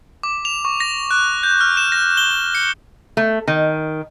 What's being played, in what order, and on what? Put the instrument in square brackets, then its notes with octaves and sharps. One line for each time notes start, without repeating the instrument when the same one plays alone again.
[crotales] D6
F7
C#6
A#6
F#6
G6
F6
E7
A#6
G7
C#7
[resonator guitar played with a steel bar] A3
D#3